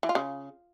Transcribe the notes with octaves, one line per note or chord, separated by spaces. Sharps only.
E3
F4
C#3